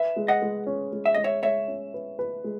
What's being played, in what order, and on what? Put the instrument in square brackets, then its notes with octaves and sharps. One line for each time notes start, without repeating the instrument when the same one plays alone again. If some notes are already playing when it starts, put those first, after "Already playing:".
Already playing: [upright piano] B4 [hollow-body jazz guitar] E5
[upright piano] G#3
[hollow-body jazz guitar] D#5 F#5
[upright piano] G#3
C#4
G#3
[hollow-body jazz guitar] E5
[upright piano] G#3 [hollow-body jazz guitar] D#5
[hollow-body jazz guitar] C#5 E5
[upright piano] G#3 [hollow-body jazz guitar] C#5 E5
[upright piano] C#4
B4
B4
G#3